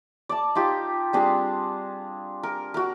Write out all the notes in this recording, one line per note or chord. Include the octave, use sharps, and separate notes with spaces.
D5 A5
D#4 F4 G4
G3 C4 D4 G#4
A#4
F#4 A#4